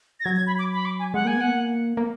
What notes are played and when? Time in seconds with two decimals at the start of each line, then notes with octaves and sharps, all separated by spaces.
0.20 A#6
0.25 F#3 G#6
0.36 G#6
0.47 B5
0.59 D6
0.73 B5
0.85 D6
0.99 G#5
1.14 G#3 F#5
1.25 A#3 G#5
1.37 B3 F#5
1.48 A#3
1.97 A#3